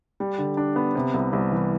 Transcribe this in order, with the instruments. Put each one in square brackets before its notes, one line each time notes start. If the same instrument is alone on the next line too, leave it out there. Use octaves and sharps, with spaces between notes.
[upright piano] G3
D3
D4
B3
C3
C2
C2
E3